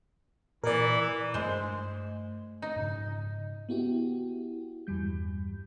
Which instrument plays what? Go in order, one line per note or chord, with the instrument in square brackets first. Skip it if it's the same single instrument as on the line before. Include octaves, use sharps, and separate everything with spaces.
[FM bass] A#2 [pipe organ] E3 E4 [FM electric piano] A#4 D5
[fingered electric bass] G2 A3 [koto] G#3 C5
[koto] D#4
[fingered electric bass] G#2 C#3
[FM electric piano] B3 E4 F#4 G4
E2 G2 G3 G6